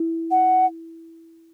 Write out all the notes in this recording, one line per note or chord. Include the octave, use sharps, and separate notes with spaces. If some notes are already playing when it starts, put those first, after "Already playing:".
Already playing: E4
F#5